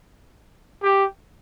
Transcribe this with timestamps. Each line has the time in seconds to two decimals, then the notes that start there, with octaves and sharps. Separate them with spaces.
0.83 G4